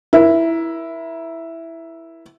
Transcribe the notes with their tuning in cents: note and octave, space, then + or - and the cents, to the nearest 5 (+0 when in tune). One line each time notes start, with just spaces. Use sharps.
E4 +0 A#4 +30